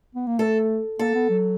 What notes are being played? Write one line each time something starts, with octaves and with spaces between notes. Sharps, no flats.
B3
A#3
A3 A4
A#3 A4
B3
F#3